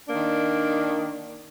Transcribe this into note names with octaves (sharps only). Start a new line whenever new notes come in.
D#3 A#3 D4